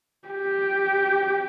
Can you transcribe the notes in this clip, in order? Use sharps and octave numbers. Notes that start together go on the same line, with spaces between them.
G4